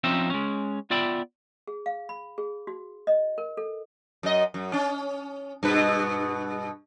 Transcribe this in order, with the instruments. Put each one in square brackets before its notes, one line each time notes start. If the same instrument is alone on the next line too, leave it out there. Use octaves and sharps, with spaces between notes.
[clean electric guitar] F3 C4 C#4 D#4 C5 E5
G#3 C#4
B3 F4 D5 E5 G5 B5
[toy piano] G#4
F5
B5
G#4
F#4
D#5
A#4
A4
[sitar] F#2 D#5
F#2
C#4
G2 B2 B4